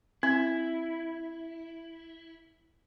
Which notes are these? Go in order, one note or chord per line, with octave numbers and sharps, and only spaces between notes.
C4 E4